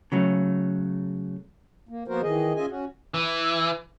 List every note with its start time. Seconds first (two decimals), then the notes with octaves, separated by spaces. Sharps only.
0.12 C#3 F#3 A3
1.89 A#3
2.08 F3 A#3 B3 F#4 A#4 C5
2.22 D#3 E3 G#4 D#5
2.56 C#4 F4 G#4 D#5 E5 G#5
2.68 C#4 F#4
3.14 E3